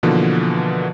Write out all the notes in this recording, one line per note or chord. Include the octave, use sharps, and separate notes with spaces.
B2 D3 E3 F3 A#3